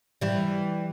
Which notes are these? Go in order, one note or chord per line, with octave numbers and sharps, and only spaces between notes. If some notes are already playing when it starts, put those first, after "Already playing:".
E3 G3